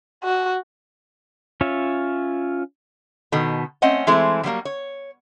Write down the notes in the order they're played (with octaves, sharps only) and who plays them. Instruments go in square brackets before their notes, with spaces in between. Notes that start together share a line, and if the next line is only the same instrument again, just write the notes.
[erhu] F#4
[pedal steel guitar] C#4 F4 C#5 E5
[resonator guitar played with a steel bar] B2 D#3 A4
A3 C4 C#4 D#5 F#5
E3 G#3 A3 C4 E4
B2 F#3 G3 A#3
C#5